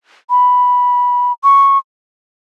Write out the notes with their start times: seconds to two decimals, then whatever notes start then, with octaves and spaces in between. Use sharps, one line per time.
0.30 B5
1.44 C#6